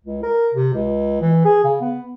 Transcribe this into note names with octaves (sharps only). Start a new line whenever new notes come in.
C#2
A#4
C3
C#2
E3
G#4
C#3
B3